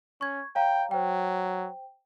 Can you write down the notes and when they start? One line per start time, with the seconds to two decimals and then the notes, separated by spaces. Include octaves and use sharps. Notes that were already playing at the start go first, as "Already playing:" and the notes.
0.21 C#4 C#6 G#6
0.55 C#5 F5 G5 A#5
0.91 F#3 C5 G5